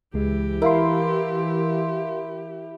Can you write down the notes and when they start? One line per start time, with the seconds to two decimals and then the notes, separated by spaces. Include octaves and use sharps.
0.14 C#2 E3 G#3 G4
0.62 E4 A#4 F5 C6